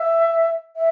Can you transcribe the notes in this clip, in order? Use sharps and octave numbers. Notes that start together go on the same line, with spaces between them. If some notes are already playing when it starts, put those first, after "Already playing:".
Already playing: E5
E5